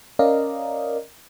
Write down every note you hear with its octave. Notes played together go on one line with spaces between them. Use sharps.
C#4 A#4 D5 D#5 F5